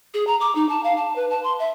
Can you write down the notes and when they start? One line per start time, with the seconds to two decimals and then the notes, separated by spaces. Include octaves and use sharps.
0.14 G#4
0.27 A#5
0.41 D6
0.55 D#4
0.69 A5
0.84 F5
0.97 A5
1.16 B4
1.30 A5
1.43 C6
1.59 E5